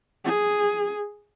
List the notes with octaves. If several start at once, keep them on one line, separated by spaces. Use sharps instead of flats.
G#4